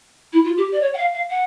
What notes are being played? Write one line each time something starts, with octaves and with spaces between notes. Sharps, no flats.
E4
F4
G4
D5
C#5
F#5
F5
F5
F#5